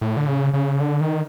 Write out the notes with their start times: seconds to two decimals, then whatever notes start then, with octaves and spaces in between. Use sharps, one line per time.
0.01 A2
0.17 D3
0.27 C#3
0.54 C#3
0.80 D3
1.01 D#3